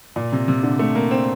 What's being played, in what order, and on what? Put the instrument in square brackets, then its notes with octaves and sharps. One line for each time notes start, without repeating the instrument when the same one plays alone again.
[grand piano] A#2
C3
C3
D3
A3
A#3
C4